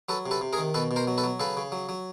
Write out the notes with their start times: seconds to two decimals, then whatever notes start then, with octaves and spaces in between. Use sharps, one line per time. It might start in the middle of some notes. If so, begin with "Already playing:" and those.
0.09 F#3 A4 B4
0.26 C3
0.31 A4 B4
0.41 C3
0.53 G#4 A#4
0.58 D#3
0.74 B2 A4 B4
0.91 B2
0.96 A#4 C5
1.07 F#3
1.18 A4 B4
1.24 F#3
1.40 C#3 A4 B4
1.57 C#3
1.72 F#3
1.89 F#3